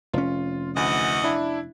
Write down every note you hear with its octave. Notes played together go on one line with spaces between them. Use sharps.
F1 C#4 F4
D2 E3 D#5 F#5
D4 E4